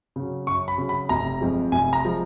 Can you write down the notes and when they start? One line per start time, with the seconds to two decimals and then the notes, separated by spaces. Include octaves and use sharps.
0.16 C#3 F#3
0.47 F#2 C#6
0.68 B5
0.78 C#3 F#3
0.89 B5
1.09 F1 A#5
1.41 F2 F3 G#3
1.72 F1 G#5
1.93 A#5
2.05 F3 G#3